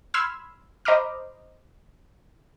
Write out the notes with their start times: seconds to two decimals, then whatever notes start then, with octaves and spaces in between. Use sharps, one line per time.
0.14 B5 C6 E6 F6 G#6
0.85 C5 D#5 A#5 B5 D6 F6